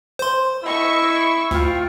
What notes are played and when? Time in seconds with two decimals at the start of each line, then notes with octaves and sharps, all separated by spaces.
0.19 C5 C6
0.64 E4 D#5 C#6 E6
1.51 D2 F4 G5